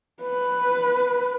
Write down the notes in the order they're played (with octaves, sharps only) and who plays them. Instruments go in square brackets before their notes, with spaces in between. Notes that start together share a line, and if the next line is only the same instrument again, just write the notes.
[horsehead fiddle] B4